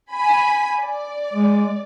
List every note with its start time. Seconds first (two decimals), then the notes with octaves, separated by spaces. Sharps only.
0.12 G#5 B5
0.80 D5
1.33 G#3